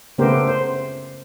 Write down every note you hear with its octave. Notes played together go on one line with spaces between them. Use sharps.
C#3 A3 B3 G4 A#4 C5
C5